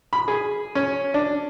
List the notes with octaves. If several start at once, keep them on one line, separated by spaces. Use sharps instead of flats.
B5
G#4
C#4
D4